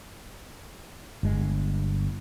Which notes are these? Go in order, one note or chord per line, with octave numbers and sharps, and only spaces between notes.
G1 G#3